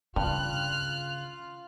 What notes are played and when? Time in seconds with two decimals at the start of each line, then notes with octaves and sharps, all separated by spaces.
0.16 G2 C#3 F4 F6 F#6